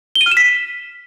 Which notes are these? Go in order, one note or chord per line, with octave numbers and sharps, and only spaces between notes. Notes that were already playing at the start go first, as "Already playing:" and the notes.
G7
D#7
F6
E7
B6